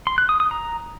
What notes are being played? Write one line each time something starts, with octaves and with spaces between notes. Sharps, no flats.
C6
F#6
D#6
D#6
A#5